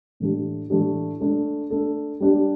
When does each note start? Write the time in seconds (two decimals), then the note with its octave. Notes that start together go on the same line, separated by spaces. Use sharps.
0.20 A2 E3 A3 D4 G4
0.70 A2 E3 A3 D4 G4
1.20 A3 D4 A4
1.70 A3 D4 A4
2.20 G3 D4 G4